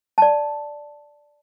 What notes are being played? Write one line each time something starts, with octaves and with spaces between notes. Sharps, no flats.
D5 A5